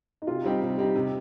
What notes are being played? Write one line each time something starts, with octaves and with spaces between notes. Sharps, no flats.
D#4
C3 F4
G3 C4 D#4 G4
C3
G3 C4 D#4 G4
C3